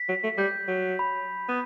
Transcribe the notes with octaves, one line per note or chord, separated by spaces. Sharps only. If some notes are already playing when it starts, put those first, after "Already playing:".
Already playing: B6
F#3
A3
G3 G6
F#3
B5
B3